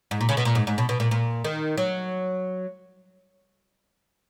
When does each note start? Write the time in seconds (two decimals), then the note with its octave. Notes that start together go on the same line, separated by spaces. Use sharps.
0.11 G#2
0.21 A#2
0.29 C#3
0.37 B2
0.45 A#2
0.55 G#2
0.67 G#2
0.78 B2
0.89 B2
1.00 A#2
1.11 A#2
1.44 D#3
1.77 F#3